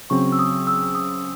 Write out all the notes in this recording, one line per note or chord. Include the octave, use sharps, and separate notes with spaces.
C#3 F#3 C4 C#6
E6
D#6
E6
D#6